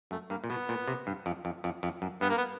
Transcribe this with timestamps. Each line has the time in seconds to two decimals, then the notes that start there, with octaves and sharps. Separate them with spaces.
0.11 F#2 A3
0.30 G2 A#3
0.44 A#2
0.50 B2 B3
0.69 A#2
0.88 C3
1.07 G2
1.26 F2
1.45 F2
1.64 F2
1.83 F2
2.02 F#2
2.21 G2 B3
2.29 A#3
2.38 B3